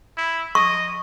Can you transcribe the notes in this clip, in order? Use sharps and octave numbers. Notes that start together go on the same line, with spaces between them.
E4
D#5 C#6